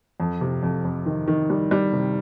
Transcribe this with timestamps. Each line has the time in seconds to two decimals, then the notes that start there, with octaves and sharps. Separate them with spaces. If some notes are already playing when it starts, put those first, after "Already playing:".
0.20 F2
0.41 C3
0.63 F2
0.85 F2
1.06 D#3
1.28 D#3
1.50 G3
1.71 G3
1.93 C3